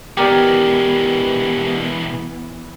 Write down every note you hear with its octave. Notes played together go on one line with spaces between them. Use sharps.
B2 E3 G#3 B3 G4 A#4 D5